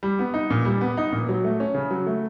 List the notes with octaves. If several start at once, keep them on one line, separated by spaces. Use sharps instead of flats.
G3
B3
D#4
A#2
G3
B3
D#4
A#2
F#3
A3
C#4
C#3
F#3
A3